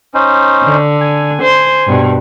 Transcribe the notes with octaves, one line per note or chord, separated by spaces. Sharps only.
C#4 D#4 C5
D3
G#5
C5
G2 B2